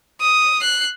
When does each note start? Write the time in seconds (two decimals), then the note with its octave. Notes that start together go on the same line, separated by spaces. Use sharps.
0.21 D#6
0.61 F#6 C7